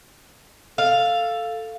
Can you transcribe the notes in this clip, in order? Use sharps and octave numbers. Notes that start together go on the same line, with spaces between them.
A4 F5